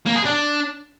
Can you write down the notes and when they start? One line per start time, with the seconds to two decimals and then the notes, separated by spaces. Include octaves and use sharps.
0.07 A#3
0.16 G#4
0.26 D4